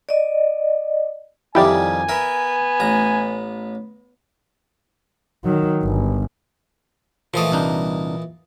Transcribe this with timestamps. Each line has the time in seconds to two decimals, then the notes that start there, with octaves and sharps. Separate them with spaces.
0.09 D5 D#5
1.55 F2 D#3 G3 E4 G4 D5 G#5
2.09 B3 A#4 E5
2.80 A1 A#5
5.44 D#3 F#3
5.83 G1
7.34 A#2 E3 F3 A3 D#5
7.52 C2 D4 D#4